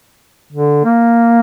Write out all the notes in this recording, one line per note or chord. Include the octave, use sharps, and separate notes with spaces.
D3
A#3